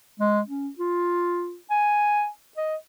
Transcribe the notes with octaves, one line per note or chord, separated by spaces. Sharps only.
G#3
C#4
F4
G#5
D#5